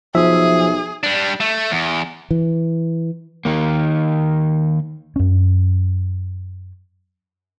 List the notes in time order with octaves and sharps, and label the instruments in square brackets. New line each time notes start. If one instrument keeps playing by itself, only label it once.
[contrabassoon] B1 [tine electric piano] F3 [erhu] G#4 [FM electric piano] E5
[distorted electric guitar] G3 D4
A3
E2
[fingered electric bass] E3
[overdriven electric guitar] D#3 A#3
[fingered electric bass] F#2 C#4